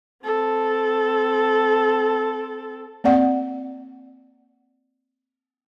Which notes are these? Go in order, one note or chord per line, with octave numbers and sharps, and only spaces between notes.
C4 A4
A#3 C4 D5 F#5